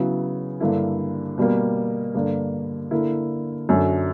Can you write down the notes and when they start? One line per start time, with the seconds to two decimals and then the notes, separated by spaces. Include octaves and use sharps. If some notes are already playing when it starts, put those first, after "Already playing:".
Already playing: C#3 F#3 B3 E4
0.60 G2 D3 A#3 E4
1.38 B2 G3 A#3
2.15 G2 D3 A#3 D4
2.91 D3 A#3 E4
3.69 F#2 D3 F#3